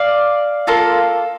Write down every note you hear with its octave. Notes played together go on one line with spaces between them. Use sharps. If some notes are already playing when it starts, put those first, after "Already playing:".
Already playing: D5 F5
A#3 F4 A4